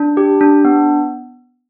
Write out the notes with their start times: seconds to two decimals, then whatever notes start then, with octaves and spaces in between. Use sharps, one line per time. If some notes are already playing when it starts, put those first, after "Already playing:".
Already playing: D4
0.17 G4
0.41 D4
0.65 B3